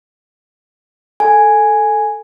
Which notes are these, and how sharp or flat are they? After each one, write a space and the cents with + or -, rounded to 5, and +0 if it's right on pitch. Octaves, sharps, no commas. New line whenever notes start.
A4 +0 G#5 +0